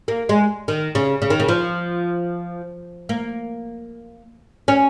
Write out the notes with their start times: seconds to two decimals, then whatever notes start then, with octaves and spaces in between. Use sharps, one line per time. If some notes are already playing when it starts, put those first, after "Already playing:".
0.08 A#3
0.29 G#3
0.68 D#3
0.95 C#3
1.22 C#3
1.30 D#3
1.40 C#3
1.48 F3
3.09 A#3
4.68 C#4